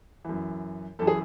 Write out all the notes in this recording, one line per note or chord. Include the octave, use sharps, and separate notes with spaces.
F#2 E3
F#2 E3 A4
G#4